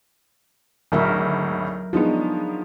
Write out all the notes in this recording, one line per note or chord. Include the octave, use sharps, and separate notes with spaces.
G#1 D2 F#3 A#4 E5
F3 G#3 B3 D4 D#4 F#4